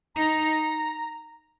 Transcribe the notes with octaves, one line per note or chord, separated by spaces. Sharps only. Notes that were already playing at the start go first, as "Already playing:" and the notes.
D#4 A#5